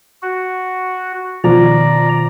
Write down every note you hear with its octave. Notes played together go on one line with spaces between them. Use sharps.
F#4
B2 D#3 F3 D5 A#5